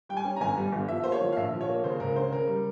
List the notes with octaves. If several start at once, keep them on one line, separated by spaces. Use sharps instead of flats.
G3 G5
G#5
C#4
A#5
G1 G#5
G3
G1
F3 E5
A#3 C5
C#5
F3
F5
A#1 E5
F3
C#5
A#3
C#3 C5
C#2 A#4
C#4 C5
C#3 A#4
G3